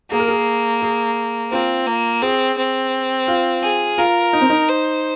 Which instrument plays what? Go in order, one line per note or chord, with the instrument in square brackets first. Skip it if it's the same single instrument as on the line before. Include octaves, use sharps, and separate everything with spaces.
[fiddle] A#3 [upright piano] G#4
[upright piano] A#4
G#4
G#4
[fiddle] C4 [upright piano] F4
[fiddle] A#3
[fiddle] C4 [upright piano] G#4
[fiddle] C4
[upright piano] F4
[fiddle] G#4
[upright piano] F4 [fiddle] A#4
[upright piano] D#4
C4
D#4
[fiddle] C5